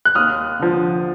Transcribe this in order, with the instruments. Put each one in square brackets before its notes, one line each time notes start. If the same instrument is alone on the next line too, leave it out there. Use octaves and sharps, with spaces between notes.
[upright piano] F#6
D#2 D#6 F6
D3 F3